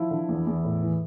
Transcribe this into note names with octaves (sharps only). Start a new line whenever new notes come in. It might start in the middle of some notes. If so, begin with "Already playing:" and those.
Already playing: F3 E4
D3
E2
E2
A2
E3